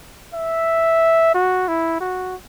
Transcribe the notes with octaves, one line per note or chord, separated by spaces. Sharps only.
E5
F#4
E4
F#4